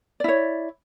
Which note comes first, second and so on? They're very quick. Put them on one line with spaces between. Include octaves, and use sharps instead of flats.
D5 E4 C#5